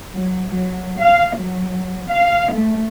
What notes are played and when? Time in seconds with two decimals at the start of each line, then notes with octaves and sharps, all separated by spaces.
0.12 F#3
0.48 F#3
1.00 F5
1.35 F#3
2.09 F5
2.52 A3